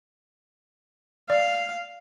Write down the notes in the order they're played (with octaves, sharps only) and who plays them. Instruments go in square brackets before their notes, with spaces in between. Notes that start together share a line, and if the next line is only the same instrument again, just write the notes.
[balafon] D5 [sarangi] F5